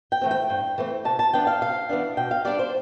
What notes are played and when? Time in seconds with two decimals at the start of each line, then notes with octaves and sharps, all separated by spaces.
0.12 G5
0.21 E3 A3 C4
0.31 G5
0.50 G2
0.78 E3 A3 C4
1.05 C3 A5
1.19 A5
1.33 E3 B3 D4 G5
1.47 F5
1.61 C3 F5
1.89 E3 B3 D4
2.17 B2 G5
2.31 F5
2.45 G3 D4 D5
2.59 C5